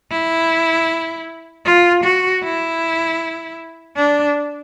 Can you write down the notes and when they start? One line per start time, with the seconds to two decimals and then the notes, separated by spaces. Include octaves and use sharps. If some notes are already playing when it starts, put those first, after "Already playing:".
0.11 E4
1.65 F4
2.04 F#4
2.43 E4
3.96 D4